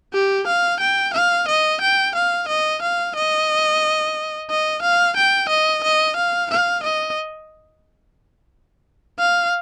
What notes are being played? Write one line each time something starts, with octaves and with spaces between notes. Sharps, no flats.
G4
F5
G5
F5
D#5
G5
F5
D#5
F5
D#5
D#5
F5
G5
D#5
D#5
F5
F5
D#5
F5